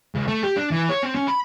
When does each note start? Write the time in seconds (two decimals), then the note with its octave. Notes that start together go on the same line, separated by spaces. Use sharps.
0.15 C#2
0.28 A3
0.43 G4
0.56 D4
0.71 E3
0.89 C#5
1.03 C4
1.15 C#4
1.28 B5